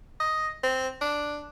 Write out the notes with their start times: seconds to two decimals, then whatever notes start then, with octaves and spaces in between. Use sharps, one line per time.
0.20 D#5
0.63 C4
1.01 D4